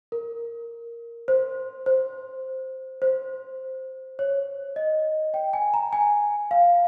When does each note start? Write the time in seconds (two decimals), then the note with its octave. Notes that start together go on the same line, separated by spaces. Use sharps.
0.12 A#4
1.28 C5
1.86 C5
3.02 C5
4.19 C#5
4.76 D#5
5.34 G5
5.53 G#5
5.74 A#5
5.93 G#5
6.51 F5